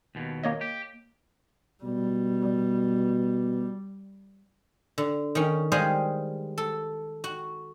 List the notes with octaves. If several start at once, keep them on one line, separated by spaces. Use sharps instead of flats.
D#2 B2
A#3 C#5 D#5
G4
B2 G3
D3
D#3 C#4
G3 G#3 G#4 C5 D#5 F5
A4
F#4